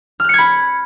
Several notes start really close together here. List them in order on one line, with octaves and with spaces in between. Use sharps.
F6 F#6 C#7 G#6 B5